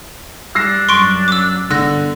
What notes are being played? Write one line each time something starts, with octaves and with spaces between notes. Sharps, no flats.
G3 D4 E6 A#6 C7
F#2 C6 C#6 D7
D6 E6
G1 D3 E6 F#6 A#6